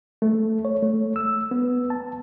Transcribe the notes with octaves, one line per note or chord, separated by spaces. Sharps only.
A3
C#5
A3
E6
B3
A5